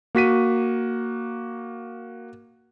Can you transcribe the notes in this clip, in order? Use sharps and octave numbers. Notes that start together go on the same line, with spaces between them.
A#3 F#4 B6 D#7